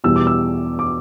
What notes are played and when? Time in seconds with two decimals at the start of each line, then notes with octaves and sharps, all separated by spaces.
0.04 E2 B2 G3 E6
0.16 D6
0.27 E6
0.79 D6